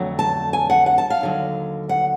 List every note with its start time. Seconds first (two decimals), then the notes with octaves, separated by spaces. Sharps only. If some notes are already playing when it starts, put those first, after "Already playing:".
Already playing: F2 D3 F#3 A3
0.19 A5
0.53 G#5
0.70 F#5
0.86 F#5
0.98 A5
1.10 F5
1.21 D#2 D3 F#3
1.89 F#5